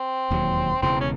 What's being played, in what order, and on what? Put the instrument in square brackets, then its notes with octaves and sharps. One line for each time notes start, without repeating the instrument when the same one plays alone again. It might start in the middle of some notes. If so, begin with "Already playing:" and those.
Already playing: [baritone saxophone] C4
[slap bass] E1 D#2 D#3 F#3
[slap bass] E1 E2 C#3 E3 [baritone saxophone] C4
[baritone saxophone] C#4